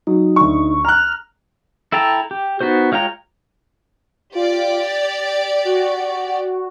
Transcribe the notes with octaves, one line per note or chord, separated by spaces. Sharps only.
F#3 D#4
D2 C#6
A#5 F6 F#6
E4 A4 G5 A5 A#5
G4
B3 D#4 F#4 C5
G#3 F4 C#5 G5 A#5
F4 G4 D5
A6
F#4